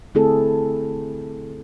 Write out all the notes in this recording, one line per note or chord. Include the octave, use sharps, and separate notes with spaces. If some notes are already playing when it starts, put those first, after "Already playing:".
D3 A3 C4 E4 G#4 A4